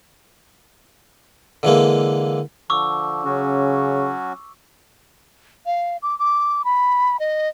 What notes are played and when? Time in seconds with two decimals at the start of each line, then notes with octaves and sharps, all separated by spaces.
1.63 D3 E3 G#3 A#3
2.70 D3 F3 C#6 D6 E6
3.25 C#3 F#3 C#4 F#4
5.66 F5
6.02 D6
6.19 D6
6.65 B5
7.20 D#5